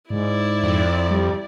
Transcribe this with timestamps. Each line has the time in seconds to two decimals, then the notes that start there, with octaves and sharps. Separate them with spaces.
0.10 G#2 E4 D5
0.63 F2
1.10 G3